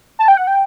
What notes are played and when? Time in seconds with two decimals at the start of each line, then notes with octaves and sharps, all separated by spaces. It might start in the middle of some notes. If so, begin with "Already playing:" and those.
0.19 A5
0.28 G5
0.37 F#5
0.47 G5